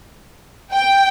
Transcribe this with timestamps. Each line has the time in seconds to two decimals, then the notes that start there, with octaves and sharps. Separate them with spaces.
0.71 G5